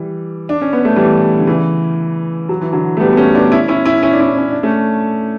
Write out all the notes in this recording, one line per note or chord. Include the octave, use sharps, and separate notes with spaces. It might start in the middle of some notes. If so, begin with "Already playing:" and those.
Already playing: E3 G3
D4
C#4
B3
A3
E3 G3
D3
C#3 E3
F#3
E3
D3 F#3
A3
G3 B3
B3
A3 C#4
B3 D4
C#4 E4
C#4 E4
C#4 E4
C#4 E4
D4
C#4 E4
C#4
D4
A3 C#4